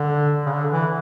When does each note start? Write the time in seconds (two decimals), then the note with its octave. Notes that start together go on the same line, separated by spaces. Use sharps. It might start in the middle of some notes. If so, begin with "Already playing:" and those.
Already playing: D3
0.46 C#3
0.53 D3
0.72 E3